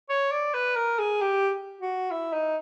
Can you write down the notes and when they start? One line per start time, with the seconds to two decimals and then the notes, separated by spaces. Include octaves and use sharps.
0.09 C#5
0.31 D5
0.54 B4
0.76 A#4
0.99 G#4
1.21 G4
1.81 F#4
2.11 E4
2.33 D#4